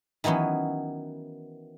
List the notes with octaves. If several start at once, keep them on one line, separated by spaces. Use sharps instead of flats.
D#3 E3 F#3 B3 C#4